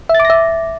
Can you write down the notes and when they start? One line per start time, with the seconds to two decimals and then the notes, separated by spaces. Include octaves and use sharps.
0.09 E5
0.15 A6
0.20 D6
0.25 A#6
0.30 E5